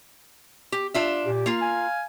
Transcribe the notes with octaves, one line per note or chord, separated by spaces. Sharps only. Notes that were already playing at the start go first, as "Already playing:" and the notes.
G4
D4 F4 E5
A#2 G4
A#3 F4
F5 G#5